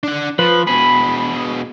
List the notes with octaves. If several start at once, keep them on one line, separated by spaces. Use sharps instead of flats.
D4 F#5
F3 B4
B2 G#4 B5